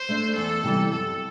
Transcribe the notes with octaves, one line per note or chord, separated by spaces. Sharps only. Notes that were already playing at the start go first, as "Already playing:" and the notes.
Already playing: C5
A3 D4
E2 A4
C3 E3 G3
F#2 A4